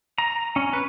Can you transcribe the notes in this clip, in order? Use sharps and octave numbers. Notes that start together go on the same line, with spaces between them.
A#5
C#4
B4